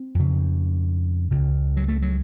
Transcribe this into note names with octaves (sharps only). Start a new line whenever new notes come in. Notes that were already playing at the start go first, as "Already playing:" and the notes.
Already playing: C4
F2 C#3
C#2 C#3
F#3
A3
F#3